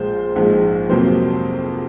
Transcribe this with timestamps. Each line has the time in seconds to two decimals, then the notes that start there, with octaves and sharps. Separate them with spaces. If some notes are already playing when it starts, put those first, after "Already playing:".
Already playing: A#1 A#2 G#3 C5
0.36 A#1 G#2 F3 G#3
0.89 F2 C3 F#3 A#3 C5